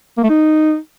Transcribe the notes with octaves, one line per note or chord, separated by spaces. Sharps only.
A#3
A3
D#4